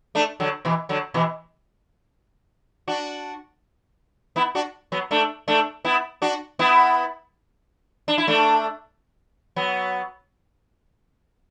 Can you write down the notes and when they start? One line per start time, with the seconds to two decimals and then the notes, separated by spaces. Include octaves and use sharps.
0.15 A3 D4
0.40 D3 F#3
0.65 B2 E3
0.89 D3 F#3
1.14 B2 E3
2.88 D4 F#4
4.36 B3 E4
4.55 D4 F#4
4.92 F#3 B3
5.11 A3 D4
5.48 A3 D4
5.85 B3 E4
6.22 D4 F#4
6.59 B3 E4
8.08 D4
8.18 E4
8.28 A3 D4
9.56 F#3 B3